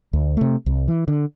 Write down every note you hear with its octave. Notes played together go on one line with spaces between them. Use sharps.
D2
C3 A3
C2
E3
D3